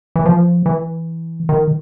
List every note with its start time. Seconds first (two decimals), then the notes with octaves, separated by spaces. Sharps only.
0.16 E3
0.26 F3
0.66 E3
1.49 D#3